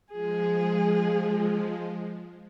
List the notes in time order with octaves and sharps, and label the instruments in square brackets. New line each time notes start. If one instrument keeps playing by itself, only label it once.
[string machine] F3 G#3 [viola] G#4